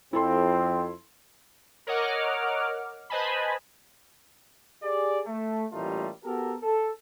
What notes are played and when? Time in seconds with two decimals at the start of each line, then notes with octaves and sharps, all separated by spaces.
0.13 F2 C4 E4 A4 C6
1.87 A#4 C#5 D#5 F#5 D6 F6
3.10 B4 C5 D#5 G#5 A5 B5
4.83 G4 G#4 D5
5.26 A3
5.72 A1 A#2 G3 A3 D#4 F4
6.24 B3 F#4 G4 A4 A#4
6.62 A4